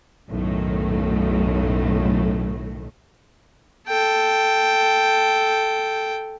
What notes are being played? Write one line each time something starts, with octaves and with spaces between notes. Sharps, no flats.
B1 F#2 A2 D#3 A3
A4 G5